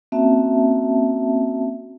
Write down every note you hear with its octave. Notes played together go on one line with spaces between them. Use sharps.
A#3 C4 C#4 F#4 E5 A5